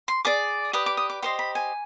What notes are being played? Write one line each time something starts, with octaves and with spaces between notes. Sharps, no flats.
C6
G#4 D5 D6
G4 B4 D5 D#6
D6
D#6
D6
G4 C5 D#5 C6
B5
G#5